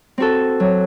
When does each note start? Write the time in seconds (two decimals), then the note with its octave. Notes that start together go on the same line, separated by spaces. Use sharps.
0.18 C4 F#4 A4
0.60 F#3